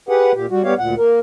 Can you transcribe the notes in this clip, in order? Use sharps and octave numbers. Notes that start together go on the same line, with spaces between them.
G4 G#4 B4 F#5
A#2 G4
G3 F#4
G3 B3 G4 C#5 F5
D2 A#2 F#5
A#3 A#4